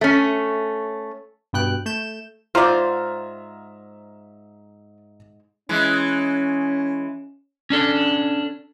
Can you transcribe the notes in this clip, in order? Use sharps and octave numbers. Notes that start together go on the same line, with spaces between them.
A3 C#4
G2 B2 G5 F#6
A3 G6 E7
G#2 F4 C5 D5 E5 A#5 F6
E3 G#3 C#4
C#4 D4 A4